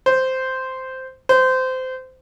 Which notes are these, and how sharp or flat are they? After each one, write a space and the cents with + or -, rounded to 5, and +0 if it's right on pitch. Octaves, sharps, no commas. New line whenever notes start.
C5 -5
C5 -20